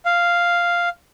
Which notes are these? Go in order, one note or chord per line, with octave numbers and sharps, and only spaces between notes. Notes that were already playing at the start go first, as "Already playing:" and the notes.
F5